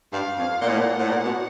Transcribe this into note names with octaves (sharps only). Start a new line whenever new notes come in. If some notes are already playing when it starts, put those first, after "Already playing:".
G2 F5
F2
A#2 F#5
A2
A#2
A2
A#2
B2